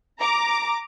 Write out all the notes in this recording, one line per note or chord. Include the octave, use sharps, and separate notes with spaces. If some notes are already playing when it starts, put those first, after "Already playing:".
A#5 D6